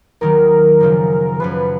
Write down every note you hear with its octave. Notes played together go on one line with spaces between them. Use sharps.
D#2 D#3 F#3 A#4
F#2 C#3 F3
F#2 C#3 F3 B4